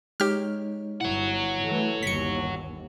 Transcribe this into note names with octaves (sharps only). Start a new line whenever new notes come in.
G#3 D#4 G4 C#5 F6
G1 G2 E4 C#5 F#5
E3 A3
G1 D#2 B6 C#7